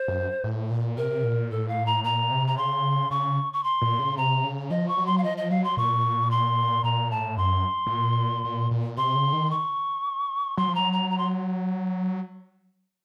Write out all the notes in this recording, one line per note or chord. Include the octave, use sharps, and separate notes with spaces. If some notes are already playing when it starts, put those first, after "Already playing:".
Already playing: C5
F#2
A2
A#2
C3 A#4
A#2
A2 A4
F5
A#5
A#2 A#5
C3
A#5
C#3 C6
C#3 C#6
C#6
C6
A#2
C#3
C3 A#5
C#3
F3 D#5
C#6
F#3
C6
F5
F3 D#5
D#5
F#3 F5
C6
A#2 C#6
C6
A#2 A#5
A2 A5
F#2 C6
A2
A#2
A#2
A#2
C3 C6
C#3
D#3
C#6
F#3 C6
F3
F#3 A#5
A#5
A#5
C6